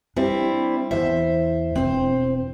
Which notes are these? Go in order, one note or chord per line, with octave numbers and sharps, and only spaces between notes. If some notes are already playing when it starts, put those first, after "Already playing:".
G3 C4 D4 E4
E2 E4 C5 E5
E1 C4 C5